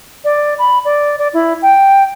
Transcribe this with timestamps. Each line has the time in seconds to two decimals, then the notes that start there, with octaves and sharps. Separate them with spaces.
0.25 D5
0.59 B5
0.85 D5
1.18 D5
1.34 E4
1.62 G5